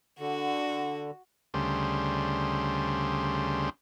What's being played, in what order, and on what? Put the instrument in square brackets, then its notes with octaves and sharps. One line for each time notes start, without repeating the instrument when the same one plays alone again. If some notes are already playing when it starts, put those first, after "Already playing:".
[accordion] D3 [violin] F#4
[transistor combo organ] D2 C#3 G3 C5